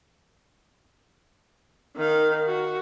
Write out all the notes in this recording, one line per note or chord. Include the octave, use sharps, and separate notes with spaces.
D#3 F5
F#4